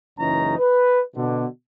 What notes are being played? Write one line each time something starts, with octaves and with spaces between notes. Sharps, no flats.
F#1 C#2 E3 C#4 D#4 A#5
B4
B2 D3